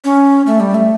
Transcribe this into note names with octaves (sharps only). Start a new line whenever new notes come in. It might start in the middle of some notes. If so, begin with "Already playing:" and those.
C#4
A3
G3
A3